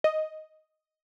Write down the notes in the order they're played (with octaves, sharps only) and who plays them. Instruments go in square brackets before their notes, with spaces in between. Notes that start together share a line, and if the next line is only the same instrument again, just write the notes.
[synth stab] D#5